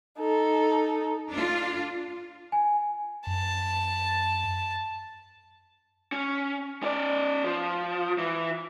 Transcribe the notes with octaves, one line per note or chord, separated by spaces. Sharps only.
D#4 A4
D4 F4
G#5
F#2 A5
C#4
C#4 D5
F3
E3